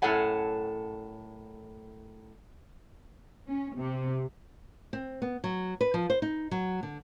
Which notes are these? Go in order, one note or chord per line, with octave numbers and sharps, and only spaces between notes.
F#2 A2 A4 C#5 F#5 G#5
C#4
C3
C4
B3
F#3
B4
F3
C5
D#4
F#3
D3